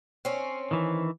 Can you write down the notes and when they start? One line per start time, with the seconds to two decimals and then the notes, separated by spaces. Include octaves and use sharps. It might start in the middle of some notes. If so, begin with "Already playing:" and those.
0.25 C4 C#4
0.71 D#3 E3